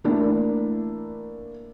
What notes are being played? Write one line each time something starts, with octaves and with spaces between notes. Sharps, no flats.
E3 A3 A#3 D4 E4